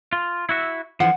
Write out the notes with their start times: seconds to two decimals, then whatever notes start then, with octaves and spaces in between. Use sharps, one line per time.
0.13 F4
0.49 E4 F#4 E5
1.00 D3 E3 F3 F#5